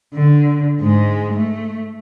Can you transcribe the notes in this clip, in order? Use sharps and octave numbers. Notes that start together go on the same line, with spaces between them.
D3
G#2 G#3
A3